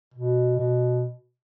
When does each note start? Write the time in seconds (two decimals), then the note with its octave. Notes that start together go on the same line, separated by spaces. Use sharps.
0.14 B2
0.57 B2